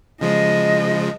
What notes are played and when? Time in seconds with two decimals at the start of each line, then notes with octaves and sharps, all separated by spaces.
0.21 C#3 F3 G#3 D#5